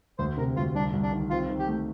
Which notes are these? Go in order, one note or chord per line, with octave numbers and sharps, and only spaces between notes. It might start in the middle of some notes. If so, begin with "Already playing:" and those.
D2 C5
C3 A#4
D2 F4
C2 D4
C2
D4
D#3
C4 F4
D#3
G4
A3